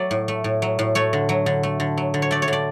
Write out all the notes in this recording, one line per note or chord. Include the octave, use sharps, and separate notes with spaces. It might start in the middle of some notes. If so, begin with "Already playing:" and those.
Already playing: F#3 A3 D5
A2
A3
A2
F#3
A2
A3 C#5
D3
F#3
D3
A3
D3
F#3
D3
C#5
A3 D5
C#5
D3 D5